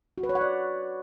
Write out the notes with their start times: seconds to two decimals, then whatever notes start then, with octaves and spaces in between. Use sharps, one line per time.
0.18 F#4
0.23 B4
0.29 C#5
0.35 F#5
0.41 D5